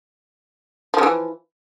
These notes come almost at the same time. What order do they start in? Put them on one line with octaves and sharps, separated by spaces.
F3 C#3 E3